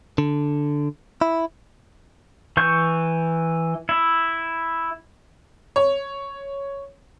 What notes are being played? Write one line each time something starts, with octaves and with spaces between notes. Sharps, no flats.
D3
E4
E3 C#6 G6
E4
C#5